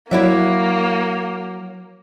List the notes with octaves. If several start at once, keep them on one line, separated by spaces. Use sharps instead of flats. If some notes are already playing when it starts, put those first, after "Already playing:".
F#3 A#3 E4 C#5 D5 E5